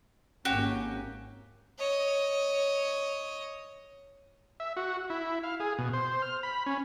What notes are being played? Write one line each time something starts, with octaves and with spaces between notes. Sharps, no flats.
G#1 A#3 C#4 F#4 G4
C#5 D#5
E5
F#4
E4
F5
G#4
B2
C5
F6
B5
C#4